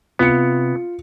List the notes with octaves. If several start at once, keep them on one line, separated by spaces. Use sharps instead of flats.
C3 B3 F4 C#7